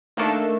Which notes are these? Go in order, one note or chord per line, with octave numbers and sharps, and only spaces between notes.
D#3 A3 A#3 D4 A4